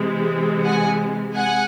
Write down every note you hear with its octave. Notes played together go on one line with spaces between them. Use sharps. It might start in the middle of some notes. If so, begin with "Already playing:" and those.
Already playing: C3 E3 G#3
F#5 G#5
F#5 G#5